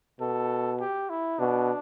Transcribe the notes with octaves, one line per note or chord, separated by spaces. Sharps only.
B2 A4
G4
E4
B2 D4